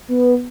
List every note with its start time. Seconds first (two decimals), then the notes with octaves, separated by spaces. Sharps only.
0.08 B3